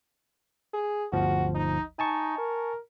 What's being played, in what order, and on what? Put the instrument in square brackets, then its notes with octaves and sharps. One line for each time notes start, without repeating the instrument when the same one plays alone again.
[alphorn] G#4
[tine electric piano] G1 D2 F3 [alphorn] F#4
[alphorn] D#4
[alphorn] D#4 [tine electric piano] G#5 A5 C#6
[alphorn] A#4